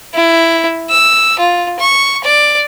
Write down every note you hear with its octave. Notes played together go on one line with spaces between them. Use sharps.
E4
E6
F4
C#6
D5